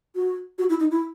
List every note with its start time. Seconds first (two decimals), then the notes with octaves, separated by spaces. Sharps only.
0.16 F#4
0.58 F#4
0.69 E4
0.80 D#4
0.91 E4